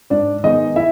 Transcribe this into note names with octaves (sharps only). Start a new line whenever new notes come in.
G#2 D4 D5
D#3 G#3 B3 D#4 D#5
E4 E5